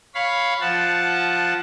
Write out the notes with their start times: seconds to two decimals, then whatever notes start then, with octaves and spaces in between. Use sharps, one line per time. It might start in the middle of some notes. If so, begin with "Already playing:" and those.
0.14 C#5 F5 B5
0.61 F3 F#5 A5